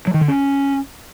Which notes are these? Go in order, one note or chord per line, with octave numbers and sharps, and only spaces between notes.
F#3
D#3
D3
C#4